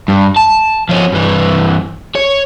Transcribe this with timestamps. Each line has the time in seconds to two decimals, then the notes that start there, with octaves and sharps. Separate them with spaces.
0.08 G2
0.37 A5
0.89 F3 C#4
1.12 G2 E3
2.15 C#5